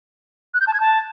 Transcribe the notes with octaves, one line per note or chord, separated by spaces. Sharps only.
F#6
G6
A5
G#6
A5